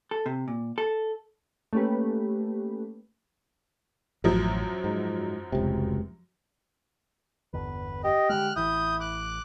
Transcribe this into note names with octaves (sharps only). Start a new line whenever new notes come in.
A4
C3
A#2
A4
A3 A#3 C#4 G4 B4
A1 F#2 F3 F#3
G#2
F1 C#2 C3
G1 E2 D3 B4
G4 D#5
D3 G3 G#3 F6 F#6
A1 E3 E4 D#6 G6
D6 F#6